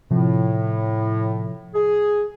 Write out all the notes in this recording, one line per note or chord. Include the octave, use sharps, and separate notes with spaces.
A2 C3 F3
G#4